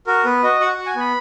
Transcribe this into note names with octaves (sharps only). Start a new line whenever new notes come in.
F#4 A#4
B3 B4
F#4 D#5
F#4 F#5
F#4 F#5
G#5
B3 B5